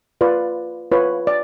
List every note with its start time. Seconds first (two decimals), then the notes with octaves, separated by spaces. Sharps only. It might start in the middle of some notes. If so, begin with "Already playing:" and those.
0.21 F4 B4 D5
0.92 F4 B4 C#5
1.27 D5